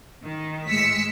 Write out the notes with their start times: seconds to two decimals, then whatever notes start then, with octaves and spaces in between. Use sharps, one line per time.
0.22 D#3
0.68 A2 G#3 E6 B6 C#7